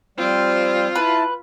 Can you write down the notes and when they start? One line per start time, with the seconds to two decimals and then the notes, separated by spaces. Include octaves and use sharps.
0.18 F3 G3 C4 F4
0.95 E4 B4 A5